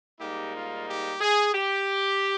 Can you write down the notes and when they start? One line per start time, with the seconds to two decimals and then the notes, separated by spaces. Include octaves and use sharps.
0.20 G#2 G3 A#3 D#4 G4
0.54 F4
0.87 G4
1.21 G#4
1.54 G4